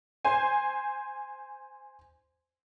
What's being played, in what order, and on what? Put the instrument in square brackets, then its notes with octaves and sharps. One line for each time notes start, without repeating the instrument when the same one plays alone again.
[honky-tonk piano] C5 G#5